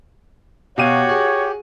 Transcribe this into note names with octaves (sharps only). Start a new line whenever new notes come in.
B2 F#4 G4 C#5 F5 D#7
G#4